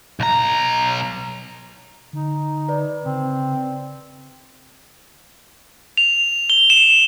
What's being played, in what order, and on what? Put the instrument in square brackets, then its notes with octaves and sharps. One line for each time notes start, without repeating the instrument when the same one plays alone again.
[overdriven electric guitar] B1 A#5
[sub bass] D3 [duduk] D#4
[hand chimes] B4 D5
[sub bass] C#3 [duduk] C4
[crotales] F7
G7
E7